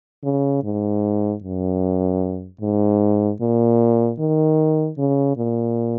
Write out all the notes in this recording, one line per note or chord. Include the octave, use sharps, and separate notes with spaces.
C#3
G#2
F#2
G#2
A#2
D#3
C#3
A#2